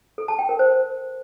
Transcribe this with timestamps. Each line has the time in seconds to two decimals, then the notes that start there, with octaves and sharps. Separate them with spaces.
0.18 A4
0.28 A5
0.39 G5
0.49 A#4
0.59 C5